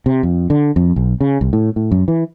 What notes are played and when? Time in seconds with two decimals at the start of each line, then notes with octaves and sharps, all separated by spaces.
0.06 C3
0.23 F2
0.50 D3
0.76 F2
0.96 B1
1.21 C#3
1.41 C2
1.53 A2
1.76 A2
1.91 F#2
2.08 E3